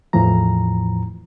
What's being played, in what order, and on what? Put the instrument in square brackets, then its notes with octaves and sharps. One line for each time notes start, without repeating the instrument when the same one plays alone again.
[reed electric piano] E2 A2 E3 F3 A#5